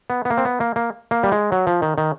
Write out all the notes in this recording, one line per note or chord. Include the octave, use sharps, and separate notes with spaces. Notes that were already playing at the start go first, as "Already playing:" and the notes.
B3
B3
A#3
C4
B3
A#3
A#3
A#3
G3
G#3
F#3
F3
D#3
D#3